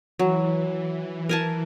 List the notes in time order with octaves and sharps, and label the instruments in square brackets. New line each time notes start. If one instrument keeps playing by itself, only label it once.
[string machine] E3 [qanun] F#3
[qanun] A#4 G#5 A5